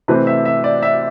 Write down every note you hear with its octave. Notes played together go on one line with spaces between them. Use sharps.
C3 E3 A3 C4 B4
E5
E5
D5
E5